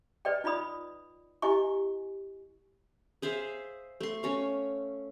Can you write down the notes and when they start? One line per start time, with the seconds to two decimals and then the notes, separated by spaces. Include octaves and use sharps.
0.25 B4 D5 D#5 G5
0.44 D#4 F4 D5 B5 D#6
1.42 E4 G4 D#5 G#5 C#6
3.22 G#4 C5 E5 F5
4.01 A3 C6
4.23 C#4 C#5 F5